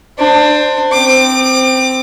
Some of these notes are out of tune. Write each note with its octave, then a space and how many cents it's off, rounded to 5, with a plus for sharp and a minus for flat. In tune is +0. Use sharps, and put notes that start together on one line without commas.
D4 +25 C5 +0
C4 -10 D6 +30